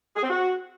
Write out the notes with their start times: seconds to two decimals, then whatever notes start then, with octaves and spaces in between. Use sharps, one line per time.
0.16 G#4
0.23 C4
0.30 F#4